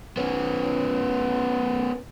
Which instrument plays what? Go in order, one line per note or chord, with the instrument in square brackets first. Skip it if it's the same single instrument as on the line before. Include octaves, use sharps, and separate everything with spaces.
[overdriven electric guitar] B3 C#4